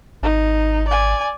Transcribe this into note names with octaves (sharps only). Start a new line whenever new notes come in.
G#1 D#4
D5 G#5